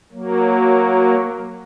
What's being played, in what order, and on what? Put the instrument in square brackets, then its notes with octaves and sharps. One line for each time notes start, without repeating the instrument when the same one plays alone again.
[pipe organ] F#3 A#3